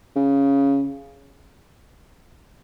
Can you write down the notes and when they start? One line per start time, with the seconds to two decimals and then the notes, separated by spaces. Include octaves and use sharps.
0.16 C#3